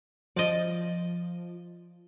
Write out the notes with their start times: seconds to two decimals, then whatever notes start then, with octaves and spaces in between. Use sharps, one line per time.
0.36 F3 D5 D#5